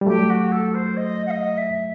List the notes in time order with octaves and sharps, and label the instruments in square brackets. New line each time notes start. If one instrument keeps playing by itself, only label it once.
[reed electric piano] G3
[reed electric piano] F#3 A3 [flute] G4
[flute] F#4
A4
C5
D#5
F#5
D#5
E5